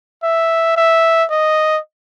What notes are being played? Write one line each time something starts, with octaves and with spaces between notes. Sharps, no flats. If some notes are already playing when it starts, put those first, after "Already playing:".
E5
E5
D#5